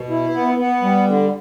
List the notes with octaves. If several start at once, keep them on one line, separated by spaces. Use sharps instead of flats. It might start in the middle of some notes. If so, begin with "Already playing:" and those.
Already playing: B2
E4
B3
B3
G3
D3